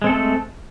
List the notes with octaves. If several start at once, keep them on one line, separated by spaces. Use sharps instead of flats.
G#3 A3 C4 A4